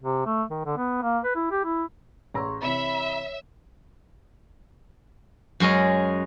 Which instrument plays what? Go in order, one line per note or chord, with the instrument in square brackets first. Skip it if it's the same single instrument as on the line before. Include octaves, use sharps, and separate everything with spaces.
[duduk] C3
A3
D#3
D3
B3
A#3
B4
E4
G4
E4
[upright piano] A1 A#5 E6 [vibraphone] G#4 C6 C#6
[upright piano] C3 E3 [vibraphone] C#5 [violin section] E5 [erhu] B5
[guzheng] F#2 G#3 C#4 D#5